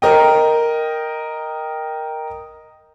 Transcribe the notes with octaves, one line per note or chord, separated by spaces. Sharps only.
A#4 D#5 G5